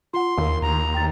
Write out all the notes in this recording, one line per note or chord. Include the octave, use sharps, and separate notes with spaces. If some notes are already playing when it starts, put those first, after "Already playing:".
F4 F#5 C6
D#2 A#4 F5
D#2 A#5
G5 A6